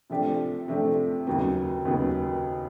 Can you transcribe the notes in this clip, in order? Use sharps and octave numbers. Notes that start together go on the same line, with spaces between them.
C3 F3 A3 D4 G4
C3 F3 A3 D4 G4
D#2 C#3 F#3 B3
D#2 C#3 F#3 B3